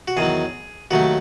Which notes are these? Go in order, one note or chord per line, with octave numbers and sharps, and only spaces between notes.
F#4
E2 D#3 F#3 G#4
D#2 D#3 F#3 A3 F#4